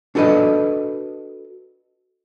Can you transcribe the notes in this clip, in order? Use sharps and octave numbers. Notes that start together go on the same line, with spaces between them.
D4 F#4 A4 B4 D#5